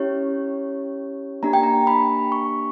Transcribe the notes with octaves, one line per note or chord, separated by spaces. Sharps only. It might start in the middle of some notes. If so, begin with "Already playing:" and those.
Already playing: C#4 E4 G4 C#5
A#3 D4 G4 A#5
G5
A#5
B5
C#6